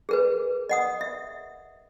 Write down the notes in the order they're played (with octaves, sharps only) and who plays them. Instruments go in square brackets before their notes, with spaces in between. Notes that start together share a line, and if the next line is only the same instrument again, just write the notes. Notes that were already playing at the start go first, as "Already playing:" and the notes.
[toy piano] G#4 A#4 B4
D#5 F#5 D#6
E5